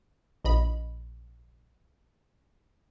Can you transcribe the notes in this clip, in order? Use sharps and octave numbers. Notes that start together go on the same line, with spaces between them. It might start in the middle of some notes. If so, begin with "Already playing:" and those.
A#1 D#5 B5